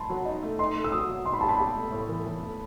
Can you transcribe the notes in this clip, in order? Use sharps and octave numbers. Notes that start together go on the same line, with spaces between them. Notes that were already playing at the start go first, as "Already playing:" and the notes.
Already playing: A5 B5 C6
F#3
D#4
A3
D#4 C6
A3
E6
F#3 D#6
F#3
D#4 C6
B5
G4 A5
B5
G4
A3
A2
E3
E3
A3